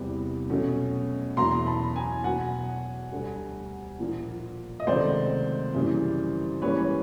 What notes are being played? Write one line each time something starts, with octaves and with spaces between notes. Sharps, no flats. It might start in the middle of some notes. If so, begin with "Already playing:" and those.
Already playing: E2 C3 E3 G3 B3
B2 F#3 A3 C#4
E2 B2 F#3 A#3 A#5 C6
A5 B5
G#5 A#5
B2 F#3 B3 F#5 G#5
D2 D3 G3
A#2 F3 A#3
D#5
C#2 C3 D#3 F#3 A3 C5 D5
F#2 C#3 E3 G3 A#3
G#2 E3 G3 A#3 C#4 B4 C#5